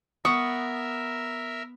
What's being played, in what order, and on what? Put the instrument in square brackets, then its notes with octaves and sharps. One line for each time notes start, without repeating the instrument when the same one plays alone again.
[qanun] B3 [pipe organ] A#4 E5 [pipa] C#6 [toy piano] D#6